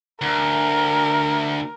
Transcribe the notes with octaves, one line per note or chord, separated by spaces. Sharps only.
D2 A#4